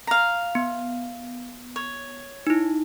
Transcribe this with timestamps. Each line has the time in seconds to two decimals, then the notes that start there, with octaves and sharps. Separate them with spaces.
0.07 F5 A#5
0.55 B3
1.76 C#5
2.47 D#4 E4